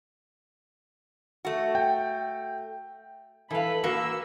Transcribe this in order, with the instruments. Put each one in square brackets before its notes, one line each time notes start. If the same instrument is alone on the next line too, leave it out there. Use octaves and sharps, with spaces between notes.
[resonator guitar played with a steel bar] A3 F#4
[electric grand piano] G5
[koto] E3 F5 [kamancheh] A4 B4 [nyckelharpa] B5
[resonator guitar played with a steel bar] A#3 [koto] F#4 [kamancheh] E6